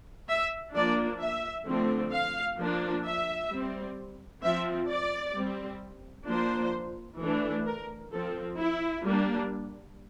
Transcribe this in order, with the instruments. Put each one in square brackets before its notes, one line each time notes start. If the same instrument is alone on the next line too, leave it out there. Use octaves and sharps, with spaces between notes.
[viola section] E5
F3 A#3 D4 D5
E5
D3 F3 A3 C4
F5
F3 A#3 D4
E5
G3 C4
F3 C4 E5
D5
G3 C4
F3 A#3 D4 C5
E3 A3 D4
A#4
F3 C4 A4
E4
G3 A#3 D4